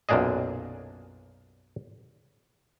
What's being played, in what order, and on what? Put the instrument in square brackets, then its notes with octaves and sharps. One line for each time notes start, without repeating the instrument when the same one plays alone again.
[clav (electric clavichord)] B1 F#2 A#2 D4 G#4 D#5